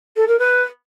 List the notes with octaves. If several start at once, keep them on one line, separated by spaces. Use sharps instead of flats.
A4
A#4
B4